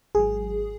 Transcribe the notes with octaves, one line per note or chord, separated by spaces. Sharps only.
G#1 G#2 F#3 G#4